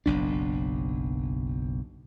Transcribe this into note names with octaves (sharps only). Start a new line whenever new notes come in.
F#1 B1 D4